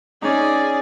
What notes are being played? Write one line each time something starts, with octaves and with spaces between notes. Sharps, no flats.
C#4 D#4 G#4 D5